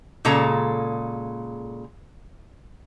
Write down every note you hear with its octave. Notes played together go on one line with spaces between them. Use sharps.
A#2 C#3 G#3 A4 A#5